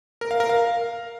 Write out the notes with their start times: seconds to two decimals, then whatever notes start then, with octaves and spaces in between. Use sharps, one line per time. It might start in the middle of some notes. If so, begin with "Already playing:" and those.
0.21 A#4
0.31 F5
0.40 A#4
0.49 F5